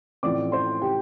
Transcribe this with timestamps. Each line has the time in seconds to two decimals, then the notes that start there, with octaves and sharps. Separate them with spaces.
0.23 A1 A2 F3 C4 D5 D6
0.52 C5 C6
0.82 G4 G5